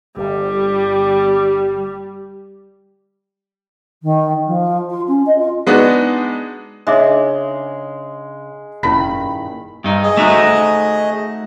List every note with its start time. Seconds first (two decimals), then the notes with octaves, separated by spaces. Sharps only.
0.17 G1 G3
4.03 D#3
4.47 F3
4.90 F4
5.08 C#4
5.26 D#5
5.39 F4
5.67 G#3 B3 D4 D#4 F#4
6.87 C#3 G#3 D4 D#4 E5 D6
8.83 F1 G2 A#2 D#3 C#4 E4 G#5 B5
9.84 G2 D#4
10.03 G#4 D#5
10.17 A3 D#4 F#4